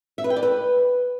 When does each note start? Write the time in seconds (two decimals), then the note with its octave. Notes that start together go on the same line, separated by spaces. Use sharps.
0.18 E5
0.24 B4
0.30 G5
0.36 D5
0.43 B4